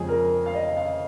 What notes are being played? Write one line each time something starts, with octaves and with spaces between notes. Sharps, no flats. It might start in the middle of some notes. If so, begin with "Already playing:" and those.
Already playing: F2 C#3 G#3 G#4
A#4
F5
D#5
F5